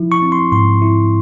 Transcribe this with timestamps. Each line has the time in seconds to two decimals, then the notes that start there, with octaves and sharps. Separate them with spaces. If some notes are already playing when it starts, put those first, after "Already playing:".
Already playing: F3 E4
0.12 C#6
0.22 C4
0.32 C6
0.52 G#2 C6
0.82 E4